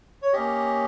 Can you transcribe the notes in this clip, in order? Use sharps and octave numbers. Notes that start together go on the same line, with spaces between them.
C#5
A#3 C#4 G4 D#5